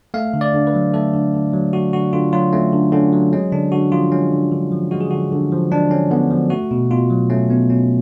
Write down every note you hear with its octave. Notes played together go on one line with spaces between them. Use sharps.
A3 F5
D3
D5
D3
B4
F#3
A3 A4
D3
D3
F#3
A3 F#4
D3 F#4
D3 F4
F#3 F4
A3 C#4
D3
D3 C#4
F#3
G#3 C#4
D3 D4
D3 F#4
F3 F4
G#3 C#4
D3
D3 F4
F3
G#3 F#4
G#4
D3 F#4
D3
F3
G#3 D4
D3 C#4
D3 B3
F3
A3 F#4
B2
B2 F4
F#3
A3 C#4
B2 B3
B2 C#4